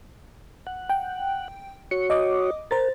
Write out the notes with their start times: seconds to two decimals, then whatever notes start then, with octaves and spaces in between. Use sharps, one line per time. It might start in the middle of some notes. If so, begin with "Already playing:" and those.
0.67 F#5
0.89 G5
1.91 F#4 C#5 C#7
2.10 D#5 D6 D#6
2.71 A#4 C5 A#5 A6